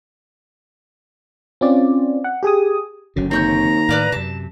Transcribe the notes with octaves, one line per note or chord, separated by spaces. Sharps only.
C4 C#4 F4 D5
F#5
G4 G#4 G#5 D#6
F#1 F#2 D3
D#2 C4 C#5 A#5 G6
A2 D#3 B4 D5 F5
F#2 C3 A5